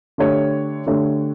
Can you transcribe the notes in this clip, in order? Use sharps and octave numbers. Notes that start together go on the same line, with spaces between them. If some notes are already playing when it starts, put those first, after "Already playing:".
D3 A3 D4 G4 C#5
D3 A3 D4 G4 C#5